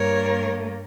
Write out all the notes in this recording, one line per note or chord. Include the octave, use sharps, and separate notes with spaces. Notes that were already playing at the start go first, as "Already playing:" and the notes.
Already playing: G2 G3 A#3 A#4 C#5